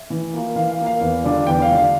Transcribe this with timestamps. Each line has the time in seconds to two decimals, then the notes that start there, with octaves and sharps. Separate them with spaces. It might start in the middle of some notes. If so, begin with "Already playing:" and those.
Already playing: E5
0.10 E3
0.34 A#3 F4
0.56 E3 F5
0.71 F5
0.78 A#3 F4
0.86 F5
1.01 E2
1.24 D3 G3 D4 F4
1.47 E2 G5
1.62 F5
1.68 D3 G3 D4 F4
1.76 F5